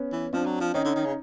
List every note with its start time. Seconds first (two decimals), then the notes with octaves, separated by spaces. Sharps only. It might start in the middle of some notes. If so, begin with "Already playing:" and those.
Already playing: B3 C#4
0.12 E3
0.33 F3 C4 D4
0.46 F#3
0.60 F3
0.74 D#3 C#4 D#4
0.85 D3
0.96 D#3
1.05 C#3